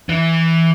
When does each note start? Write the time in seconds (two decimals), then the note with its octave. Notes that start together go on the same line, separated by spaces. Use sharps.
0.09 E3